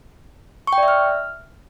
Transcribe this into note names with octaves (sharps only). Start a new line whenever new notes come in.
C#6
G5
D5
E5
F6